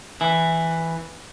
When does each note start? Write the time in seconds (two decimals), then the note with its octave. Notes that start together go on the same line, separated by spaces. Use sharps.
0.21 E3